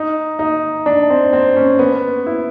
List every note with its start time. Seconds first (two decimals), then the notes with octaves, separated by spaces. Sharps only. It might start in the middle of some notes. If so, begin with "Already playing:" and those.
Already playing: D#4
0.39 D#4
0.86 D4
1.10 C4
1.33 C4
1.56 C#4
1.79 B3
2.26 E4